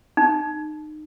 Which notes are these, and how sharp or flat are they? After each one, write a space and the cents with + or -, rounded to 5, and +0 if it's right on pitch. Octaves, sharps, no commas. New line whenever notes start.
D#4 -30